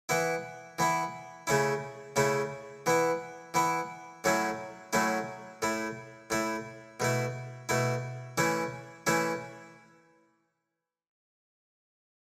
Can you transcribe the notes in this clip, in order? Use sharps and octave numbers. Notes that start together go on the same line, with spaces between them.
E3 B3 E4
E3 B3 E4
C#3 A3 C#4 E4
C#3 A3 C#4 E4
E3 B3 E4
E3 B3 E4
A2 F#3 A3 C#4 E4
A2 F#3 A3 C#4 E4
A2 A3 E4
A2 A3 E4
B2 A3 E4
B2 A3 E4
E3 A3 C#4 E4
E3 A3 C#4 E4